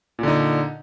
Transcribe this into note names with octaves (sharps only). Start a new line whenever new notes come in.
A#2 D3 D#4